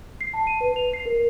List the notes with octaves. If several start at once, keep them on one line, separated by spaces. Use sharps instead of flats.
C7
A5
D#7
B4
F7
C7
A#4